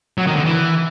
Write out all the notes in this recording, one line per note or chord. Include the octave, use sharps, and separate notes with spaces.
F#3
D#3
D3
E3